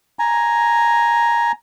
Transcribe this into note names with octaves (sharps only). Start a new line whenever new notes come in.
G#5 A#5